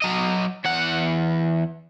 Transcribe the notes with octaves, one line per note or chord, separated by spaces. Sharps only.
F#3 D#5
E2 F#5